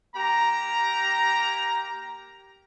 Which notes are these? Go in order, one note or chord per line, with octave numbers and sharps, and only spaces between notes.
A#3 G4 A#5